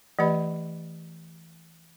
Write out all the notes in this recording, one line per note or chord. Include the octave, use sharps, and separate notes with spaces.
E3 A3 G4 B4 D#5 B5